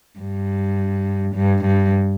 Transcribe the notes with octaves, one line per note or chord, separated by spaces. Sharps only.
G2
G2
G2